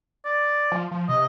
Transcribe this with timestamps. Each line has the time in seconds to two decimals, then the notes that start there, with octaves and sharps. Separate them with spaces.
0.25 D5
0.72 F3
0.91 F3
1.09 C3 D#5